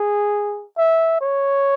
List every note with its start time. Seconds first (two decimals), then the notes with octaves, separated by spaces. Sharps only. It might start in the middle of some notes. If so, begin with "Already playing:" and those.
Already playing: G#4
0.78 E5
1.21 C#5